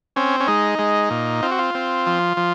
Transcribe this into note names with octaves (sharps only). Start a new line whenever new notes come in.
C4 C#4
C#4
G#3 D#4
G#3
A#2
C4 F4
F#4
F4
C4
F3
F3